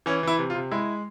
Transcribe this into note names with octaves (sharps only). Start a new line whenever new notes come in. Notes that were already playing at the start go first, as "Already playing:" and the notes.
E3 C#4
E3 E4
C3
F4
C3
G#3 E4